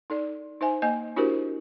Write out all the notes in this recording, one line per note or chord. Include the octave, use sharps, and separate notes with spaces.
D#4 A4 D5
D#4 C5 E5 G#5
A#3 D#5 G#5
D4 E4 F#4 G4 A#4 C5